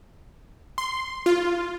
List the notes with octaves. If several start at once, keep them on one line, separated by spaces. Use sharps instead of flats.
C6
F4